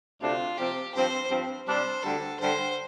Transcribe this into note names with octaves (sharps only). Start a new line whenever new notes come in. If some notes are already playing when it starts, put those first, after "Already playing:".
D2 C3 A3 D4 F4
C3 F3 C4 G4
G2 F3 C4 C5
G2 F3 C4
C3 G3 D4 C5
D2 D3 G3 A4
G2 D3 G3 C5